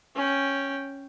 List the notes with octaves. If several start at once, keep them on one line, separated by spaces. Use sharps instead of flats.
C#4 G5